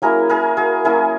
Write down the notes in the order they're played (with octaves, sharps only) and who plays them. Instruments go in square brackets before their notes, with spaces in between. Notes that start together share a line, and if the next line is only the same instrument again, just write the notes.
[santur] F#3 A#3 C#4 E4 G#4 A#4
G#4 A#4
F#4 G#4
F#3 A#3 C#4 E4 G#4 A#4